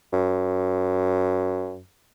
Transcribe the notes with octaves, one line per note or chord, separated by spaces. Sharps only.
F#2